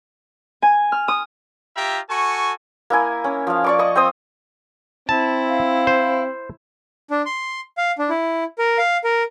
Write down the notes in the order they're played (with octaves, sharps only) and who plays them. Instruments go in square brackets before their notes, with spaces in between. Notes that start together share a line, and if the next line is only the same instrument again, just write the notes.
[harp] G#5
F6
D#6
[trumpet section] F4 G4 E5 G5 A#5
F#4 A4 G#5 C#6
[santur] A#3 E4 G#5
C#4
F3 F5
D5 C#6 D6
D#5 C#6
C4 C5 D#6
[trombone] C4 [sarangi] E4 [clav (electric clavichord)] A5
[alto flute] F5
[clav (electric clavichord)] C5
[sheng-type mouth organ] D4
C6
F5
D4
E4
A#4
F5
A#4